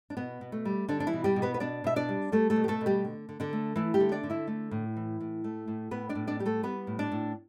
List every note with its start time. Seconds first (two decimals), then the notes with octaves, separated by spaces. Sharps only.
0.10 D4
0.17 B2 B3
0.41 B2
0.52 A3
0.65 G3
0.88 D3 G3 D4
1.00 D4
1.07 E3 E4
1.13 B2
1.24 G3 G4
1.36 B2
1.42 B3 B4
1.54 B4
1.60 B2 D4 D5
1.84 B2 E5
1.96 D4 D5
2.09 G3
2.32 G3 A3 A4
2.50 A3 A4
2.56 B2
2.64 G4
2.68 A3 A4
2.81 B2
2.86 G3 G4
3.05 D3
3.29 D3
3.40 D3 D4
3.53 A3
3.76 E3 A3 E4
3.94 G3 G4
4.00 D3
4.12 D4 D5
4.23 D3
4.30 E4 E5
4.47 A3
4.71 A2
4.96 E3
5.20 A2
5.44 A3
5.68 A2
5.91 A2 B3 B4
6.09 D4 D5
6.15 A2
6.27 D4 D5
6.39 G3 G4
6.46 A3 A4
6.63 G3 B3 B4
6.87 A2
6.99 D4 D5
7.11 A2